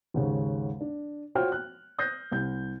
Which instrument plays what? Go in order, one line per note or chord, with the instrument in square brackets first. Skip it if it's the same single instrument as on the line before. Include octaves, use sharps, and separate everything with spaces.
[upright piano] D#2 G#2 C#3
D4
F4 F#4 C5 C#5 G5 F6
F#6
D#6 F#6 G6 A6 A#6 C7
C2 G6